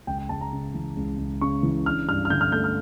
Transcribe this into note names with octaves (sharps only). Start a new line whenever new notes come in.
C#2 G5
G5
C#2 A5
A#5
C#3
E3
C#2
C#2
C#3 C#6
E3
D4 F6
G2 F6
F6
D3 G6
F6
A3 G6
F6